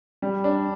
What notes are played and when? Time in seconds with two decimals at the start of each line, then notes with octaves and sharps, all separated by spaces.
0.22 G3
0.44 D4